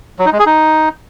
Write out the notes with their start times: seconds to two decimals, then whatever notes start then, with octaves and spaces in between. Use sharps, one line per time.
0.19 F#3
0.26 D#4
0.32 G#3
0.39 G#4
0.46 D#4